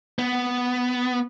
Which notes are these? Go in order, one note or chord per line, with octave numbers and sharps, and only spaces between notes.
B3